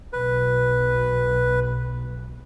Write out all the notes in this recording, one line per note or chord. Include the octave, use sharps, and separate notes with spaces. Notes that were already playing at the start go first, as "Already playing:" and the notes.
B1 B4